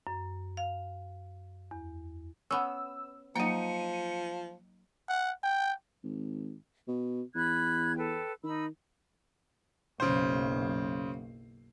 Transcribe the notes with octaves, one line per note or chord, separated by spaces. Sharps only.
F#2
F5
E2
B3 C#4 E6
F3 F#3 A#3 D#4 G5 C#7 D#7
F#5
G5
G#1
B2
E2 B5 F#6 G#6
A4 B4 G5
D#3 D#4 B5 E6
F#1 B1 C#3 C5